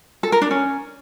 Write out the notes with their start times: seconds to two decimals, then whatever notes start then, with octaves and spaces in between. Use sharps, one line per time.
0.23 A4
0.32 A#4
0.42 D4
0.51 C#4